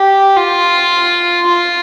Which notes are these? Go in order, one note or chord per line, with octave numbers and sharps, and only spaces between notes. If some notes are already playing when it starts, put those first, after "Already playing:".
Already playing: G4
F4
F4